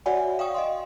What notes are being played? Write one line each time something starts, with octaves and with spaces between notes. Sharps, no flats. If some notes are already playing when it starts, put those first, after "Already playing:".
F#4 C#5 D5 E5 F#5 G#5
F5 G5 C#6 D#6
D#5 F5 C6